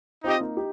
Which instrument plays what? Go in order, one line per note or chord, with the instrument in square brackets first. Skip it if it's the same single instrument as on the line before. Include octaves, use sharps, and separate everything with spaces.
[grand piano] C4 F4 [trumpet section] D#4 G4 D#5
[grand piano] A#3 D#4
D#4 G4